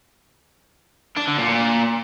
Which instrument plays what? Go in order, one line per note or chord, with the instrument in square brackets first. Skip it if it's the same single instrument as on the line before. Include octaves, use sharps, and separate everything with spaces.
[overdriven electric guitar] D4
D3
A#2
A#2